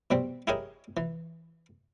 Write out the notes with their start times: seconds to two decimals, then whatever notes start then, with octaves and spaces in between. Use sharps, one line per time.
0.11 B2 G3 C4
0.47 E4 G4 G#4 A#4 C#5 D#5
0.97 E3